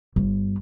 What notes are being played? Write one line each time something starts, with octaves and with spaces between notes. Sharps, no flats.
G1